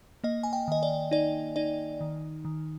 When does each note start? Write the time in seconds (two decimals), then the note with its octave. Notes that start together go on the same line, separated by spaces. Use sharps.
0.24 A#3 D#5
0.43 G#5
0.53 G5
0.68 D#3 D#5
0.83 D5
1.11 D#4 D5
1.56 D#4 D5
2.01 D#3
2.45 D#3